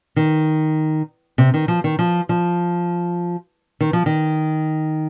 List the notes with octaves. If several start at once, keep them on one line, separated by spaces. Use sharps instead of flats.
D#3
C3
D#3
F3
D#3
F3
F3
D#3
F3
D#3